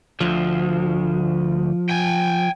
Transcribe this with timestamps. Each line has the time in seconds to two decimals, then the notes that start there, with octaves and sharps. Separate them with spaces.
0.21 D2 F3
1.89 G5 G#5